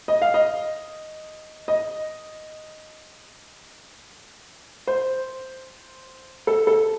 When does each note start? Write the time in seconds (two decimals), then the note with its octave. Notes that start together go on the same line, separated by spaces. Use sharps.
0.08 D#5
0.22 F5
0.34 D#5
1.68 D#5
4.87 C5
6.47 A4
6.67 A4